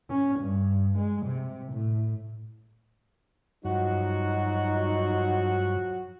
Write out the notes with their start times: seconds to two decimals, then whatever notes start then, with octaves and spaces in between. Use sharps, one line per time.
0.10 C#4
0.40 G2
0.98 G#3
1.26 C3
1.73 A2
3.65 G2 F3 F#3 D#4 F#4